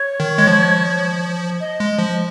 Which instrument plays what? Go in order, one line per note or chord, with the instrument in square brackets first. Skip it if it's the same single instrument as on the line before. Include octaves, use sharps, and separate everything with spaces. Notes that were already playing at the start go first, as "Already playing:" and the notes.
Already playing: [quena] C#5
[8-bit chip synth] D#3
G#3
F3
[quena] D#5
[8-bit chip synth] G#3
F3